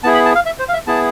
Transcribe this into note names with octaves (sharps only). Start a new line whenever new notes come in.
B3 E4 G#4 A5
B5
A5
F5
E5
C5
F5
E5
B3 E4 G#4 A5